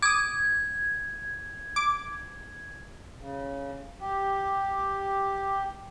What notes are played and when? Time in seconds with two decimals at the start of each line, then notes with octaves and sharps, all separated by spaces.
0.02 D6 D#6 G#6
1.76 D6
3.19 C#3
4.00 G4